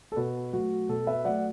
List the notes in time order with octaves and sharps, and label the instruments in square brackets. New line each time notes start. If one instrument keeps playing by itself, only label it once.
[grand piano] A4
B2 F#4 B4
F#3 A3 F#4
B2 A4
B4 E5
F#3 A3 D5 F#5